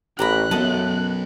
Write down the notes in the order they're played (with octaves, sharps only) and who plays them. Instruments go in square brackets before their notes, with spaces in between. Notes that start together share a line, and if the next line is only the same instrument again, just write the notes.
[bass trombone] A1 [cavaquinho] G4 A#5 B5 [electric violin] F#6
[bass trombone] F#2 [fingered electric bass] F#3 B3 [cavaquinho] A4 D#5 A5